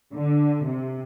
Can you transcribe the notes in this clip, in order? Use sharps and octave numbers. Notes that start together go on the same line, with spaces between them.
D3
C3